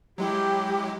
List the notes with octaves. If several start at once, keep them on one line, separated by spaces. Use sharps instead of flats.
F#3 G#3 E4 G4